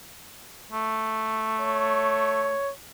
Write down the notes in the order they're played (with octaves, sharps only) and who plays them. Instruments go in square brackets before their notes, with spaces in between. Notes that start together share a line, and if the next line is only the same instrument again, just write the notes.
[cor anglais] A3
[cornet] C#5